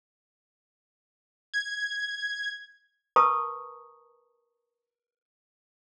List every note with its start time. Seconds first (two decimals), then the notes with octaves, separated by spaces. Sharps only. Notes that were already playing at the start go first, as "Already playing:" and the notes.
1.54 G#6
3.16 A#4 B4 A5 A#5 C#6 D#6